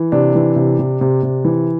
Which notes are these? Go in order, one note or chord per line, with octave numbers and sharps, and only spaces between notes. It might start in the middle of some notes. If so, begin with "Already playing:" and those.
Already playing: E3
C3 D4
E3
C3
C3
C3
C3
E3